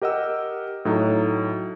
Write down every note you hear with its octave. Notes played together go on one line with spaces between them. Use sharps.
G4 A#4 D#5 F#5 E6
A2 F#3 D#4